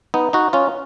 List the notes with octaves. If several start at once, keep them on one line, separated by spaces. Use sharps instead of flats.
B3 D#4
D#4 F#4
C#4 F4